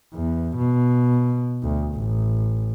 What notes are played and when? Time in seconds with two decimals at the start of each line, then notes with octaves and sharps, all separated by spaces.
0.15 E2
0.57 B2
1.63 D2
1.95 A1